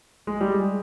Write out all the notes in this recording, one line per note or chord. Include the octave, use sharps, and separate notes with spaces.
G#3
G3
G#3